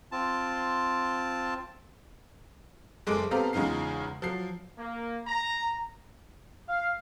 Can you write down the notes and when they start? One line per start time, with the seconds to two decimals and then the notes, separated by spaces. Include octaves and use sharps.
0.12 C4 F4 A5
3.07 F#1 G#3 A4 D6 D7
3.31 B3 C4 G4 A4 F5 A#5
3.53 E2 C#3 G#3 D#4 F4 C7
4.22 F3 F#3 C7
4.78 A#3
5.27 A#5
6.69 F5